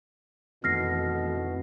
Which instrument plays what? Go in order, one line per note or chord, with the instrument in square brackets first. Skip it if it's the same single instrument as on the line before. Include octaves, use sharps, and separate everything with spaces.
[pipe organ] F2 [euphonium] B2 [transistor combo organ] D#3 E3 A3 [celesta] F6 A#6 C7